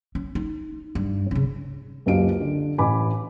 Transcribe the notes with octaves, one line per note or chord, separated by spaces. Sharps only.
C#4
D#4
G2
C#3 C#4
F#1 C#2 F#2 G4 F5 D7
D3
A1 G#5 B5 D6